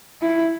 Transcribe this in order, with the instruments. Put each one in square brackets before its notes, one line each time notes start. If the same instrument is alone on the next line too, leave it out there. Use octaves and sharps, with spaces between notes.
[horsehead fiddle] E4